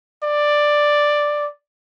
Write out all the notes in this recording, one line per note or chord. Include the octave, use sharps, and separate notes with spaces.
D5